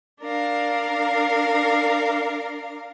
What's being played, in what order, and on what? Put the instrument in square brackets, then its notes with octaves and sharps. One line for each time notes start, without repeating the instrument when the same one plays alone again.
[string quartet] D4 A#4 F5